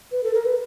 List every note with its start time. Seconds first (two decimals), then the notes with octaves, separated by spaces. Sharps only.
0.12 B4
0.23 A4
0.34 A#4
0.45 B4